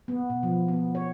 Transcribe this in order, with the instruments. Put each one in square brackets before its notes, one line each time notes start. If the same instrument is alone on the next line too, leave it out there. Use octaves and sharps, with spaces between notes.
[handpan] B3
B2
F3
B3
C#5